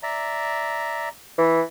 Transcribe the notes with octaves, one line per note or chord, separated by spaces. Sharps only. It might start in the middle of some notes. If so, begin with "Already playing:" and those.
D5 E5 A#5
E3